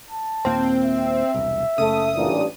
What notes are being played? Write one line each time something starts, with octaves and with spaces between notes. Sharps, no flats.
A5
D#2 A#2 A#3 C4
E5
E1 C2
F#1 C#3 A3 D#6
A1 G2 A#2